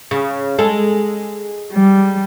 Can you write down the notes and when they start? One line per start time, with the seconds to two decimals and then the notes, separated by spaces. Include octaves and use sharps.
0.11 C#3
0.58 G#3 A4
1.73 G3